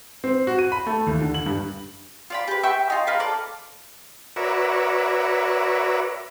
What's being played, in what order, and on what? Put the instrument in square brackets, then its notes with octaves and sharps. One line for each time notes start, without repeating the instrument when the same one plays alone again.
[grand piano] C4
F#4
D#7
B5
A3
D#2
D3
F#7
G2
[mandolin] F4 D5 B5
G4 B4
E5 G5 C#6 E6
D#4 F4
F4 A#4 B4
A4 D5 D6
[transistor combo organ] F#4 A#4 B4 C#5 D5 E5